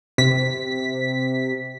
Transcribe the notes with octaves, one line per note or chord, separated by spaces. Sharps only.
C3 B6